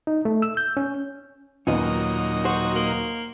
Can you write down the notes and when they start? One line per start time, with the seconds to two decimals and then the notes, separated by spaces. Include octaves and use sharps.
0.07 D#4
0.25 A3
0.42 E6
0.57 G6
0.77 C#4
1.67 D#2 A#2 F#3 B3 C#4 D#4 F4 D#5
2.45 F#4 C5
2.76 A#3